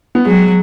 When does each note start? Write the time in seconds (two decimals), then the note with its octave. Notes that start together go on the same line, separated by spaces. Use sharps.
0.15 B3
0.25 F#3 G#3